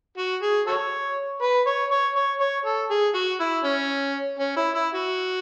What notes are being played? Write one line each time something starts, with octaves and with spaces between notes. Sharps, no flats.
F#4
G#4
F#4 A4 C#5
B4
C#5
C#5
C#5
C#5
A4
G#4
F#4
E4
C#4
C#4
E4
E4
F#4